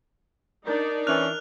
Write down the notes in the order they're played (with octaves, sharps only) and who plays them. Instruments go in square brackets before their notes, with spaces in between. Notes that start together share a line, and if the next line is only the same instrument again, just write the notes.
[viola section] D4 D#4 D5 [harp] A#4 G6 A6
[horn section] E3 C#4 [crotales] F6 F#6 F7